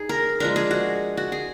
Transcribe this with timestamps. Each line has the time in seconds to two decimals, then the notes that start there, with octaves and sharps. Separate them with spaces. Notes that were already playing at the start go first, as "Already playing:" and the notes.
Already playing: D#4 G#4
0.09 A#4
0.40 F3 G#3 D4 A#4
0.56 G#4
0.71 F#4
1.17 F#4
1.32 G#4